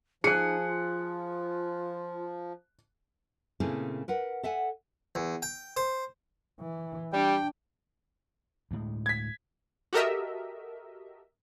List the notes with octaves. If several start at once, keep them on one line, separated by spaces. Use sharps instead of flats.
F3 D#4 G#4 F#6 C#7
F4
A#2 C#3 A3 C4 E4 G#4
A#4 B4 F#5
A4 E5 F#5 G#5
E2
G5
C5
E3
G3 D4 G5
D2 A2 G#3
G#6 B6
F#4 G4 A4 A#4 D#5 E5